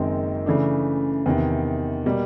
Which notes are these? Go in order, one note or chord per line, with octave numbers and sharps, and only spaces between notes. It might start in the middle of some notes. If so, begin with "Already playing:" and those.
Already playing: F#1 F#2 D#3 G#3 C4
C#3 E3 A3 D4
E2 C3 D#3
B2 G3 A#3